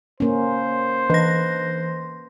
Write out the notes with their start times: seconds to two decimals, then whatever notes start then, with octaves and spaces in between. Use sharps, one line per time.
0.20 A#3 C#4 C5
1.10 E3 B4 A#6